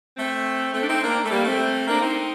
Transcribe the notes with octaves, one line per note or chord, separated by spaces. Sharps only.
A3 C4
A3 C4
D4
C4 D#4
A#3 D4
A3
G3 A#3
A3 C4
A#3 D4
C4 D#4